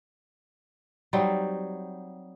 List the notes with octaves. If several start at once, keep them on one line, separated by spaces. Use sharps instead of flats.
F#3 G3 C4 D#4